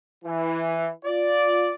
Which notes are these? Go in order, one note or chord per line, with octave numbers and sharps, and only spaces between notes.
E3
F4 D5